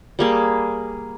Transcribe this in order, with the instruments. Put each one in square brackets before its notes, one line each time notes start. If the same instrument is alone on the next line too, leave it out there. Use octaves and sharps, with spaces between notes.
[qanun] G3 A#3 G#4